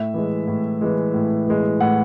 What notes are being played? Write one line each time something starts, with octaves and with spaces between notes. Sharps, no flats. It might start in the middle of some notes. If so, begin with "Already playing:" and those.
Already playing: A2 E5
E3 G#3
A2
E3 G#3
A2
E3 G#3
A2 F#5